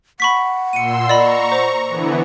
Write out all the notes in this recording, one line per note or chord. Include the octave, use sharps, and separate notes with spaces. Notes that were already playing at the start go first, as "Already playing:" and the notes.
F#5 B5 C#6 B6
A#2 C6 E6 C#7 D#7
D5 D#5 A#5 B5 C#6
C5
D3 E3 B3